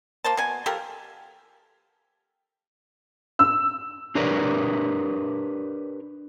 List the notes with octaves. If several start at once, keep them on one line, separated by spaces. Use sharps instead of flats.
A#3 C5 A5
B2 G#5
F3 G4 A4 A#4
E6
D4 G4 A#4 B4 C#5 D5